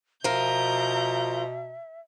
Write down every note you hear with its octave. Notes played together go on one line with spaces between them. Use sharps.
B2 F3 A#4 E5 A#5 G6